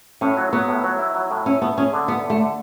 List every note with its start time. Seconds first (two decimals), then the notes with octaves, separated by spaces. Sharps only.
0.21 A2 C#4
0.37 F#3
0.53 F#3 B3
0.68 A2
0.84 F#3
0.99 E4
1.15 F#3
1.31 A2
1.46 C#4 E4
1.62 A3 B3
1.77 C#4 G#4
1.93 D3
2.08 B3 E4
2.24 D3
2.30 A3
2.39 D3